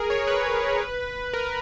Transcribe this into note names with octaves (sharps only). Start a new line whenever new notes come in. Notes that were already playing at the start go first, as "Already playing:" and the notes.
Already playing: G#4 A#4
C#5
B4
A#4